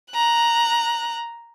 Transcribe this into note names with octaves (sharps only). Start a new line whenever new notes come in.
A#5 F#6